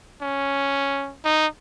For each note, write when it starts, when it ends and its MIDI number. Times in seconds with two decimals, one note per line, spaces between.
0.21 1.14 61
1.25 1.47 63